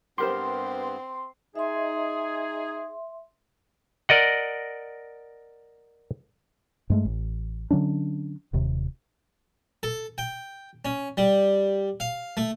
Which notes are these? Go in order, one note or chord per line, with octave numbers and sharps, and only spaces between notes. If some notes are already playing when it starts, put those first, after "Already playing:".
G2 B3 C4 G4 A#4 C5 C6
D#4 G#4 E5 C6
A#4 D5 D#5 F#5
G2 G#3 A3
A1
D3 F#3 C#4 D4
D#1 D#2 C3
A4
G5
C#4
G3
F5
A3